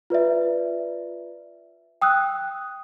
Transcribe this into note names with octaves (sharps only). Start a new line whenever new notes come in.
F4 B4 D5 E5
G5 D#6 E6 F#6